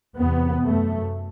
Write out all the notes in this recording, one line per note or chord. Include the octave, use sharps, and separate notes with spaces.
E2 C3 B3
F#2 A3